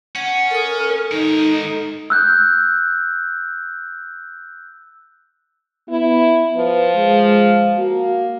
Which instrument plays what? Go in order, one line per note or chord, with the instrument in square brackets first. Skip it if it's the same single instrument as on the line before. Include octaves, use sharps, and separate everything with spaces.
[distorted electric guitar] C#4 [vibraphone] F#5
[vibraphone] A4 D#6 [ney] A#4
[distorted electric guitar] G#2 A#4 [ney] D#4
[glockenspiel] E6 F#6 G6
[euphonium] B3 [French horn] E4
[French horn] F3 [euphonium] B4
[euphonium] G#3
[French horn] A#3 [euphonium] F#4